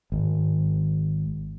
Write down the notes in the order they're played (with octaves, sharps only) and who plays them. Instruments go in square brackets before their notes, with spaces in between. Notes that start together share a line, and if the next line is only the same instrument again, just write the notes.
[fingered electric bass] G#1